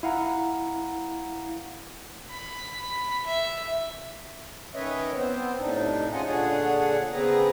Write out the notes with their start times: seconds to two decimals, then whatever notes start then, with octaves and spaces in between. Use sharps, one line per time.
0.03 E4 F5 F#5 A#5
2.31 B5
3.26 E5
4.75 D#3 C#4 B4 C#5 D#5 E5
5.16 B3 C4 C5
5.58 A2 C3 D4 D#4
6.13 C#4 F4 G#4 D#5 F#5 G#5
6.27 A#2 D3 D4 G#4 C#5 F#5
7.12 C#3 B3 C4 G#4 B4 A#5